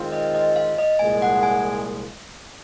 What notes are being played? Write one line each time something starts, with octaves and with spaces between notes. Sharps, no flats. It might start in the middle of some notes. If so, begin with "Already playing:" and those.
Already playing: D#3 G#3 C4 F4
D#5
D#5
F5
D#5
C2 A#2 F3 G#3 G#5
F#5
G#5